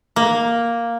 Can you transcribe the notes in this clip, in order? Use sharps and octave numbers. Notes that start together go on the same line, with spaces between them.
A#3